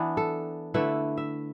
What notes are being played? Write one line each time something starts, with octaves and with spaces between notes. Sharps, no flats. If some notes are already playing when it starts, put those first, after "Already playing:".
Already playing: E3 B3 D4
A4
D3 A3 E4 B4
E5